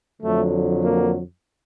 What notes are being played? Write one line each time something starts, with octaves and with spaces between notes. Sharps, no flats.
F2 D3 F#3 A3
A#3